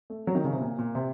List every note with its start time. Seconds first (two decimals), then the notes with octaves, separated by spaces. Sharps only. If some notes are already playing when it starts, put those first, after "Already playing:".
0.10 A3
0.27 F#3
0.35 D#3
0.44 C#3
0.53 C3
0.61 A#2
0.78 A#2
0.95 C3